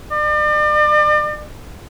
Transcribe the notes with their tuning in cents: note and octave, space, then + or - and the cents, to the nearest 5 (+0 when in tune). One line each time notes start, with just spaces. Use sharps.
D5 +40